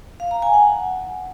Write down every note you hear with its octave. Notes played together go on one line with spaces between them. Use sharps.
F5
A#5
G#5
F#5